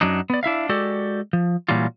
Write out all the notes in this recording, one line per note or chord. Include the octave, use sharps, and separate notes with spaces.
F#2 F#3 D4 D#4
B3 D5
D4 E4 E5 F5
G#3 F#4 G4 A4 D5
F3
A#2 E3 F#3 G3 F4